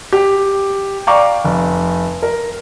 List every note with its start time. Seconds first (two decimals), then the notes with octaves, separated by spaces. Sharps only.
0.13 G4
1.07 D5 F5 G5 A#5 C#6 D6
1.44 F1
2.23 A#4